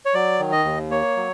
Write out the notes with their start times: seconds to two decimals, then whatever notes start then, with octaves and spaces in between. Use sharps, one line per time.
0.05 C#5
0.14 F#3 D5
0.39 D#3
0.52 D#5
0.65 D#2
0.90 A#3 C#5
1.16 F#3